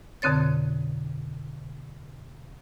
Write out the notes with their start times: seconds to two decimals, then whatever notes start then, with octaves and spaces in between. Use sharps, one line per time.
0.22 F2 B2 D3 C4 C#5 A6